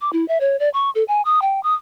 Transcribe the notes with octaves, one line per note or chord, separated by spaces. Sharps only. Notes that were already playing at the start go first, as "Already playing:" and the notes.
D6
E4
E5
C#5
D5
C#6
A4
G#5
D#6
G5
D#6